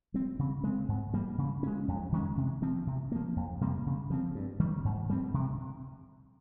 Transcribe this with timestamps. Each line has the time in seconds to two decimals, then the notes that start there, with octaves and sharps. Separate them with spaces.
0.14 G3 C4
0.39 C#3
0.64 G#3 C4
0.89 G#2
1.13 G3 A#3
1.38 C#3
1.63 G#3 C#4
1.88 F2
2.12 D#3 G#3 C#4
2.37 C3
2.62 F3 C4
2.87 C3
3.12 F3 A#3
3.36 F2
3.61 C3 G3 A#3
3.86 C#3
4.10 F3 C4
4.35 G2
4.60 D#3 G3
4.85 G#2
5.10 G3 C4
5.34 C3